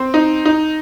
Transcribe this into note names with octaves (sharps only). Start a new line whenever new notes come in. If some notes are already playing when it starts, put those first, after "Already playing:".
Already playing: C4
D#4
D#4